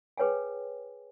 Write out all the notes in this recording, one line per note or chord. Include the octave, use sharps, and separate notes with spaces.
G#4 B4 C#5 G5 G#5